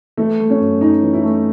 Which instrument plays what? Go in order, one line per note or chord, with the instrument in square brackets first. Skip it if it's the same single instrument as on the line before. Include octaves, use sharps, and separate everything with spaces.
[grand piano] E3 [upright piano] A3
[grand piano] A3
[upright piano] C#4
[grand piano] F#2
[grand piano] C#4 [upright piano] D#4
[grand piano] E3
[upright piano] E4
[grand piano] A3